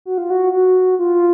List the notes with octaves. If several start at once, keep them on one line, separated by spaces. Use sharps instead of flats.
F#4
F4
F#4
F#4
F4